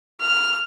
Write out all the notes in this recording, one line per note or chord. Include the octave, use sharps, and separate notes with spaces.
F6